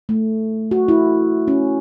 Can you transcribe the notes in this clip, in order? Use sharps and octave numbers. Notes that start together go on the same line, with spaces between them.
A3
F#4
E4
C#4